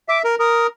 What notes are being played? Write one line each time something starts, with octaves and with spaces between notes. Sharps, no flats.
E5 D6
A#4
A#4 D#6